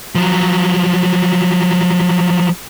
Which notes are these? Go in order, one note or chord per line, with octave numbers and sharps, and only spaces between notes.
F3 F#3